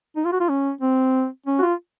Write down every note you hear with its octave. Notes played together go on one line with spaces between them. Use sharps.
D#4
F4
F#4
F4
C#4
C4
C#4
F#4
F4